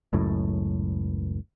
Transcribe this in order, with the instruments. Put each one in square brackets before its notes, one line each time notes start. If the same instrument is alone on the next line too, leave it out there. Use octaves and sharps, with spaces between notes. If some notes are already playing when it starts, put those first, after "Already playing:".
[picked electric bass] F#1 C#2 F#2 A2